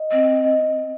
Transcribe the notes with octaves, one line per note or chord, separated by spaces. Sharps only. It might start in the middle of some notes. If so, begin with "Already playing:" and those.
Already playing: D#5
C4 D#5
D#5